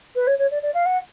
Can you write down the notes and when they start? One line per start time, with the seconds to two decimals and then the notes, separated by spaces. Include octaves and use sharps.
0.15 B4
0.27 C#5
0.39 C#5
0.51 D5
0.63 D5
0.74 F5
0.86 F#5